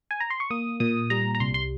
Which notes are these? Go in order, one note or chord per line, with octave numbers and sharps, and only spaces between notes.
G#5
A#5
C6
C#6
A#3 D#6
A#2 D#6
G3 A#5
A#5
C2 C6
C6